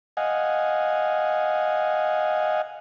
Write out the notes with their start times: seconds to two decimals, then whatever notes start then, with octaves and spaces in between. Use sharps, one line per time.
0.17 D#5 F5 F#5 G#5